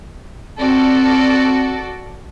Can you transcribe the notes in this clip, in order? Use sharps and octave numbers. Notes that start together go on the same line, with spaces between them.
C4 F#4 A4 D5